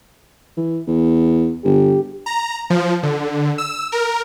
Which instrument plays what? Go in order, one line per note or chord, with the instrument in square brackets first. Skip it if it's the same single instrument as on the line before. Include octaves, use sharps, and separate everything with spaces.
[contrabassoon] E3
E2
[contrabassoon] G1 [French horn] G4
[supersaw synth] A#5
F3
D3
E6
A#4